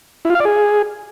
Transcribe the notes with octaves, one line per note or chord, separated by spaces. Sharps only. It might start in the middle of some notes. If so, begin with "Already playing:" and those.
E4
F4
F5
D5
G#4